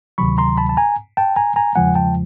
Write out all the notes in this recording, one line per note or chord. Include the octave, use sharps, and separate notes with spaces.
D2 C3 D#3 F#3 B5 C#6
A#5 C6
A5 B5
A5
G#5 A#5
G5 A5
G#5 A#5
G#5 A#5
E2 C#3 F3 G#3 F#5 G#5
G5 A5